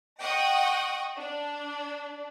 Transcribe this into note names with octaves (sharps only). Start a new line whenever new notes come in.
D#5 F#5 G5 C#6 D#6
D4